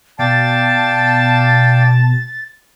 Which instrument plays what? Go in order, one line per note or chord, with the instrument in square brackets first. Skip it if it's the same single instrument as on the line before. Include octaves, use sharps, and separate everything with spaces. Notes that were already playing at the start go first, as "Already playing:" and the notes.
[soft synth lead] B2 [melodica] D5 F5 G5 [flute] A5 [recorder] A6